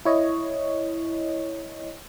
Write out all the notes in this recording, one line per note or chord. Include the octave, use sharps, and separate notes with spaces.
E4 C#5 D#5